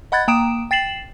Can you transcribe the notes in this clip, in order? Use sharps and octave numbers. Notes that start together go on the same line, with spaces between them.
D#5 F#5 B5 F#6 G#6 A6
A#3 G5 A#5 D#6 D7 E7
G5 A6 C7 E7 F#7